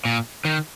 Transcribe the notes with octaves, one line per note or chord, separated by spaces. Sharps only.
A#2
D#3